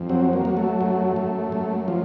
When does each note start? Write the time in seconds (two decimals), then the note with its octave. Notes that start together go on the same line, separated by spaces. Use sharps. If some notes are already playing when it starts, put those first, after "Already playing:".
Already playing: F2
0.09 F#3 C4
0.33 A#3
0.45 F#3
0.57 A3
0.81 F#2
1.16 F#2
1.52 F#2
1.88 F3